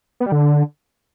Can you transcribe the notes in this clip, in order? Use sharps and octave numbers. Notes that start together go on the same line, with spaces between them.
B3
G3
D3